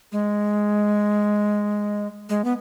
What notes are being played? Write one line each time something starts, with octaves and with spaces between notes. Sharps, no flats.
G#3
G#3
B3